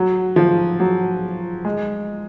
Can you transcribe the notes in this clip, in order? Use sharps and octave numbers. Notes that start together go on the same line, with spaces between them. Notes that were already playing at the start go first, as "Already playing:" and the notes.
Already playing: F#3
F3
F#3
G#3